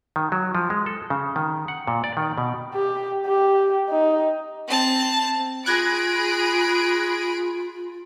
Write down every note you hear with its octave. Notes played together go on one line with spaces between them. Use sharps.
D#3
F#3
F3
G#3
A4
C#3
D#3
F#5
A#2
D5
D#3
B2
G4
G4
D#4
C4 A5
F4 G#4 B5 F#6 G#6 A#6 D7